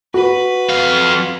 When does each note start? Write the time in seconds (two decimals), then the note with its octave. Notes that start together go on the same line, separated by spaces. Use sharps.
0.14 F#4 B4
0.69 F2 F5